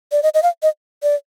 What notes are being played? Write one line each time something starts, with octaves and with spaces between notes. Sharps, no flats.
D5
D#5
D#5
F5
D#5
D5